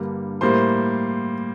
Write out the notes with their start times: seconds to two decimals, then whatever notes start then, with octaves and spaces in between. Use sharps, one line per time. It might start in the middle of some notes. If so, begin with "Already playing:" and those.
Already playing: G2 D3 G3 A#3
0.41 A2 G3 A#3 C5 C6